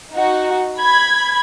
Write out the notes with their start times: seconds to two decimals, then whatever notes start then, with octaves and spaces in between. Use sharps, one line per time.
0.11 D#4 F#4
0.80 B5 G#6